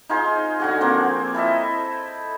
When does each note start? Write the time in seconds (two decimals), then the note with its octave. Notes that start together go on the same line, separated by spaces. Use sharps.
0.09 D#4 F4 G#4 C5
0.60 D3 F#4 G#4
0.81 F3 A#3 C4
1.34 E4 A4 D#5 E5